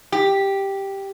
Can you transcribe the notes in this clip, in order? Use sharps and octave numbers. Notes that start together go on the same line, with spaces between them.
G4